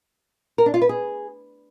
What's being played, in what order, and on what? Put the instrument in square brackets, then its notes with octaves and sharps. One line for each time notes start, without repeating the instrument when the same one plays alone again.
[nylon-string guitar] A#4
D4
F4
B4
G#4